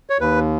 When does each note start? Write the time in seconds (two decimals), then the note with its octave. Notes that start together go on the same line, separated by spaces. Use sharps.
0.10 C#5
0.20 D#2 B4